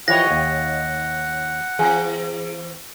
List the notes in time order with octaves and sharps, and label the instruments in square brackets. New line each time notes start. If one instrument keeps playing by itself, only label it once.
[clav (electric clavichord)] E3 F3 [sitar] G4 C#5 D#5 [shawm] F#5 [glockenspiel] A#6
[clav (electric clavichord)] D#2
[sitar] E3 C4 C5 [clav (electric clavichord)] G#4